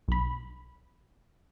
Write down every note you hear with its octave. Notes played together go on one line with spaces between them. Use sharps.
B1 B5